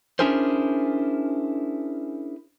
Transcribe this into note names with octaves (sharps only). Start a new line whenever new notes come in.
C#4 D4 E4 G#4 A#4 C5